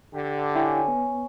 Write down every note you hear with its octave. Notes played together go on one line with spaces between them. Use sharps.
D3 G4
C#4 E4 G5
B3